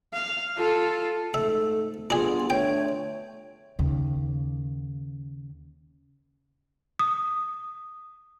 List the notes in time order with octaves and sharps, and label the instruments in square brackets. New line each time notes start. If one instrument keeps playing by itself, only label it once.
[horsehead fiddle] F5
F4 A4
[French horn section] G#2 A3 [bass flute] A4 [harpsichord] E5
[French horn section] G2 B3 [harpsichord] D4 G#4 [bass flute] F4
[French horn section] D3 A3 [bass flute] C#5 [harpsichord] G5
[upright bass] D#2 C#3
[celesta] D#6